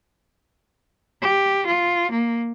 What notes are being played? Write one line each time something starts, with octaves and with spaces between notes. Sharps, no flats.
G4
F4
A#3